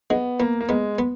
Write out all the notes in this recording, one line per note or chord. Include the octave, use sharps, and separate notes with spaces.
G#3 B3
A#3 B3
A#3
G#3 B3
B3